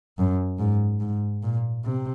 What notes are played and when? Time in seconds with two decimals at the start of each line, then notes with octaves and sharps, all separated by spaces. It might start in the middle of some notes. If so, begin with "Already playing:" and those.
0.18 F#2
0.59 G#2
1.00 G#2
1.43 A#2
1.84 C3